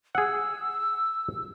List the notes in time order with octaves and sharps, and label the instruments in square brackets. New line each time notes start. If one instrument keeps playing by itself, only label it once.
[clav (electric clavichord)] G#4 F#5 [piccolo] E6